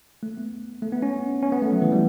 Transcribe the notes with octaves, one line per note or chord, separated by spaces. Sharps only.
A3
B3
A3
B3
C#4
C#4
B3
A3
F#3
E3
G3